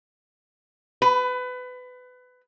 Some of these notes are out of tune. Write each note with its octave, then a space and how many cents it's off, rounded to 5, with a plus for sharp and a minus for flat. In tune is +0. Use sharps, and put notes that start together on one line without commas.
B4 +25